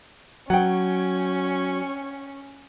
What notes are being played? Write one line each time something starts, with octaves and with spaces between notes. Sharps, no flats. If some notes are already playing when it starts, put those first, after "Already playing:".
F#3 C#4 F#5 G5